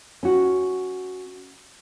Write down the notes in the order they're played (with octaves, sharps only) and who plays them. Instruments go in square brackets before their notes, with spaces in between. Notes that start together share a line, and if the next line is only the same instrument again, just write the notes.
[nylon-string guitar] C#4 F#4